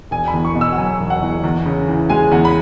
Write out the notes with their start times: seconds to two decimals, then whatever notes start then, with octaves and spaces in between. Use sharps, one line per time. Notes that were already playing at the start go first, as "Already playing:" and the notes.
0.11 E1 G#5
0.27 B5
0.33 E2
0.45 C#6
0.55 B2
0.61 E6
0.72 F#5
0.78 F#3 G#5
1.00 E1
1.10 F#5
1.22 E2
1.44 E2
1.66 C#3
1.88 E3
2.10 G#3 G#5
2.32 E2 F#5
2.45 B5